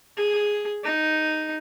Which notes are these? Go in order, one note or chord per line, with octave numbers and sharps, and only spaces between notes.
G#4
D#4